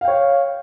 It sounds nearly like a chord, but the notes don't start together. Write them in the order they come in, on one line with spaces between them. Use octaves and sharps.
F5 G5 C#5